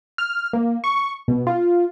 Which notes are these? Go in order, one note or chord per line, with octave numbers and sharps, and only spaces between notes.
F6
A#3
C#6
B2
F4